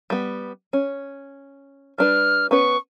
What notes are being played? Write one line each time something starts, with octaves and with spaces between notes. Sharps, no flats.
G3 B3
C#4
G3 D4 B4 F6
B3 C#4 B4 C#6